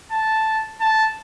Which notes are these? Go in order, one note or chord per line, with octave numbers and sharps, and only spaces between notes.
A5
A5